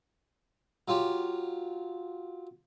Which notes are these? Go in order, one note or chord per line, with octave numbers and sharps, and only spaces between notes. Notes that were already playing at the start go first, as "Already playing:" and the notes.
F#3 F4 G4